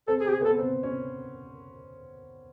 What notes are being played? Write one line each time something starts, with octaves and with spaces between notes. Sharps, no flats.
C4 A4
G#4
C4
G4
G#4
B3
A4
C4
C#4